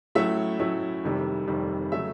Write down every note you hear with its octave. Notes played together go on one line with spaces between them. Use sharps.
A2 F#3 A3 C#4 E4 E5
A2 F#3 A3 C#4 E4
F1 F2 C3 D#3 G3
F1 F2 C3 D#3 G3
C#3 F#3 A3 C#4 E5